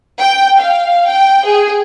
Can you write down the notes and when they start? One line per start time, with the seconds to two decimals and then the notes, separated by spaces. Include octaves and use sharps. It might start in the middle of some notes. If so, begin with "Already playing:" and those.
0.21 G5
0.59 F5
1.06 G5
1.47 G#4